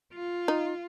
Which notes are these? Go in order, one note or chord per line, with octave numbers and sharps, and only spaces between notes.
F4
D#4